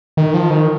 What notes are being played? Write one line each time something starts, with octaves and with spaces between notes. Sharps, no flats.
D#3
F3
D#3